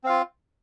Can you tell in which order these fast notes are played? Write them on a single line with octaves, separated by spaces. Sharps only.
C4 F5 F4